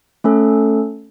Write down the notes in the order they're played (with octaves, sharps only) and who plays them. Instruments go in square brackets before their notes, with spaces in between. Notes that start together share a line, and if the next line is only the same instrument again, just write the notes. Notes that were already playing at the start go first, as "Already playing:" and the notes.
[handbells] A3 C#4 A4